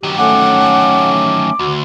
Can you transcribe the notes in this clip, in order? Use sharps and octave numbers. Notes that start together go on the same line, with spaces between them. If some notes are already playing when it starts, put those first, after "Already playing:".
D#3 F#3 G4
A3 C#4 F#5 D6
D2 F#4